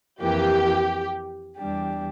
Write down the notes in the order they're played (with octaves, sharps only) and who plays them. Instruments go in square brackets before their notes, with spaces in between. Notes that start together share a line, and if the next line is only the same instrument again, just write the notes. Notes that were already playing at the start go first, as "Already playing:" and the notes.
[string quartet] F2 E3 A#3 [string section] G4
[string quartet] E2 E3 G3 D4 G4